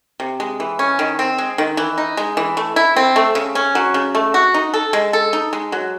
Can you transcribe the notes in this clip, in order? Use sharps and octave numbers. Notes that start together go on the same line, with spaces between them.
C3
G#3
E3
C#4
D#3
C4
G#3
D#3
E3
D#4
G#3
E3
A3
E4
C4
A3
C#3
C#4
F#3
C#3
A3
F#4
D#4
A4
G#3
A4
D#4
G#3
F#3